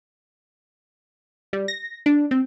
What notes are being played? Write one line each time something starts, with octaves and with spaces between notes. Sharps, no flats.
G3
A#6
D4
C4